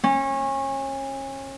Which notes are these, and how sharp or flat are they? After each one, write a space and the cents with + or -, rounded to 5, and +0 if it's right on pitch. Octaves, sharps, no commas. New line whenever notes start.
C#4 -30